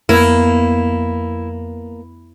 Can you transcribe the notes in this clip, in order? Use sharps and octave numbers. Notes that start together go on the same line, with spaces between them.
F2 A#3 B3 E4